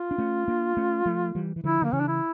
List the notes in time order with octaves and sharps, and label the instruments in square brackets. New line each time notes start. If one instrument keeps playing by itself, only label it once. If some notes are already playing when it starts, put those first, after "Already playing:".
Already playing: [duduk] F4
[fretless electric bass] D4
A3 C#4
A#3 D4
A3 C#4
F3 A3
E3 G3
E3
[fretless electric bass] D3 F3 [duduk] E4
[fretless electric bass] D3 [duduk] A#3
[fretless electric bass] C#3 E3 [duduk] C#4
[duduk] D4
E4